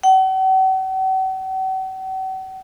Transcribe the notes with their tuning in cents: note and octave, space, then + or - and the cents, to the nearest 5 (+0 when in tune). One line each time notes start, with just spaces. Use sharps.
F#5 +45